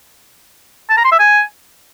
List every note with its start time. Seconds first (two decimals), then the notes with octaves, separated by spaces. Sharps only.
0.90 A5
0.97 A#5
1.04 C6
1.12 E5
1.19 G#5